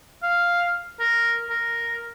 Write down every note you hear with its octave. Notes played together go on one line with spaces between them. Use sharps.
F5
A#4
A#4